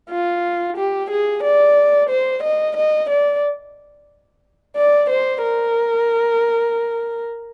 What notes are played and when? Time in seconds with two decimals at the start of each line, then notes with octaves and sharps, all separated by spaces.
0.10 F4
0.77 G4
1.10 G#4
1.43 D5
2.10 C5
2.43 D#5
2.76 D#5
3.10 D5
4.76 D5
5.10 C5
5.43 A#4